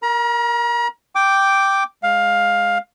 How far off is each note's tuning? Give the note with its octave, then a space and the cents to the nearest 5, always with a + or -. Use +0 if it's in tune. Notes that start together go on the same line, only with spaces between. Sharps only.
A#4 +0 A#5 +40
G5 +0 D6 +0
G#3 +0 F5 +15